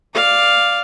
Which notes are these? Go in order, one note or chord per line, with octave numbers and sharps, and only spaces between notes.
D5 F5